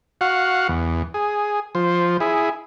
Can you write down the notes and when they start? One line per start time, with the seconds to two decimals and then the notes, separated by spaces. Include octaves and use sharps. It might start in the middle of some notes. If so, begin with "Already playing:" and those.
0.21 F#4 F5 F#5
0.68 E2
1.14 G#4
1.75 F3 C5
2.20 E4 G#4